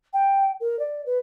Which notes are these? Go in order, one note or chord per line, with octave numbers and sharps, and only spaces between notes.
G5
A#4
D5
B4